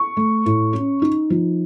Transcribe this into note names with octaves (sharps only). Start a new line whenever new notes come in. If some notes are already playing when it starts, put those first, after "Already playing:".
Already playing: C#6
A3
A2
C#4
D#4
F3